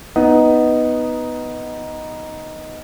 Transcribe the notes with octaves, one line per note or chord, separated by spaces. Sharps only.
B3 D#4